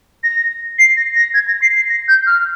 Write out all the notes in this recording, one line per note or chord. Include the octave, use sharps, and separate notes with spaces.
A#6
C7
A#6
A#6
G#6
A#6
C7
C7
A#6
G6
F6